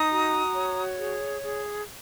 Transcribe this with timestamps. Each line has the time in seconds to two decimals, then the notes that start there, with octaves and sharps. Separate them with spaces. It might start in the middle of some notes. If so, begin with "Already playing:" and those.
Already playing: D#4 A#5 D#6
0.10 F#4
0.55 C#5
0.99 G#4
1.44 G#4